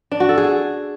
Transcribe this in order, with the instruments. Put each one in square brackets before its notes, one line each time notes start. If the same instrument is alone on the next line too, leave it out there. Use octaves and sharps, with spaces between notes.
[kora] D4
F#4
A4
G#4